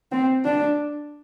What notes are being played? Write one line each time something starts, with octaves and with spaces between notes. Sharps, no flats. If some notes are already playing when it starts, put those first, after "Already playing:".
C4
D4